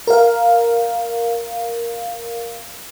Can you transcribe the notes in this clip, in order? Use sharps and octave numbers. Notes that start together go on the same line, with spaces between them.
A#4 F5